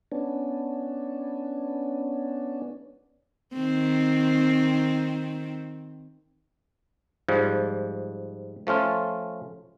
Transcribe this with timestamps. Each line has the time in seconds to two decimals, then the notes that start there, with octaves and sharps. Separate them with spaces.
0.12 B3 C#4 D4
3.54 D#3 C4
7.29 G#2 F3 G3
8.67 F3 A3 C#4 F4